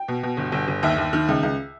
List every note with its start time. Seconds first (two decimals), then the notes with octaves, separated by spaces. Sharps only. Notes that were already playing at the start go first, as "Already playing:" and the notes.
Already playing: G5
0.08 B2
0.23 B2
0.37 G1
0.52 G1
0.68 G1
0.83 D#2 E5
0.98 D#2
1.13 D#3
1.28 C#2
1.43 C#2